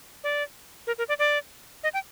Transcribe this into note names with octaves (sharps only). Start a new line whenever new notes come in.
D5
A#4
A#4
D5
D5
D#5
G5